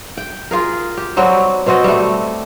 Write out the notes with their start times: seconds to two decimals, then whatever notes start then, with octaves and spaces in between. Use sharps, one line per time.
0.17 G5
0.51 F4 G#4 A#4
0.97 G4
1.17 F#3 G3 C4 F#4
1.66 B2 C4 F#4 D#5
1.84 G3 A3